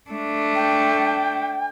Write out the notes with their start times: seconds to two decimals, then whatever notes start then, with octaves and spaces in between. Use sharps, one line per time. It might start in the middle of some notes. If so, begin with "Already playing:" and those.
0.10 A3 D4
0.55 G5